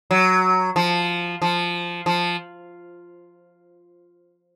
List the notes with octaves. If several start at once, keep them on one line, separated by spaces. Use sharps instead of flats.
F#3
F3
F3
F3